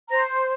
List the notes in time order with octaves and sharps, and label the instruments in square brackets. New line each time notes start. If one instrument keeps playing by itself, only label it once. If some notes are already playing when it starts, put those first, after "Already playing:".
[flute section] C5 A#5